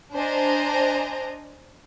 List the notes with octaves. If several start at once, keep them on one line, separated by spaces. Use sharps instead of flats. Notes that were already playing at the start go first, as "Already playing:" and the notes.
D4 C5 D#5 G#5 A#5